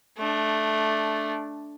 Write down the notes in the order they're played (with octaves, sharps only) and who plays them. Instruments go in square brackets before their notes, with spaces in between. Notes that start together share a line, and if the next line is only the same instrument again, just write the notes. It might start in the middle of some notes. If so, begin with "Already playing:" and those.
[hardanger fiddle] A3 D4